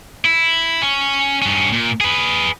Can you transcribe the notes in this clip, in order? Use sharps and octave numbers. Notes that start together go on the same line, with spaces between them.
E4
C#4
G2 C#4
A#2
G#4 B4